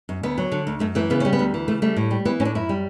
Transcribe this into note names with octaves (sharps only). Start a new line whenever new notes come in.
F#2
D2 B3
F#3
D3
D2
F#2 A3
E3 A3
C#3 B3
G3 C#4
B3
D2
E3
C#3 A3
G3 A3
A2
G3
E3 B3
A2 C#4
D4
F#2 E4
G3